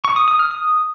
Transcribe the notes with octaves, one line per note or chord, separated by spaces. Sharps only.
C#6
D#6
D#6
F6
D#6